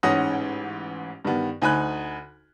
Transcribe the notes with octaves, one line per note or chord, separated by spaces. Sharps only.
A1 G#2 C#4 F#5 D#6 A#6
G2 D#3 B3
D2 D#4 G#5 B5 F#6